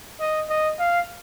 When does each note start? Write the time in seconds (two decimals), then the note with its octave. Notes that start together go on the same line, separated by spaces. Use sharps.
0.20 D#5
0.49 D#5
0.79 F5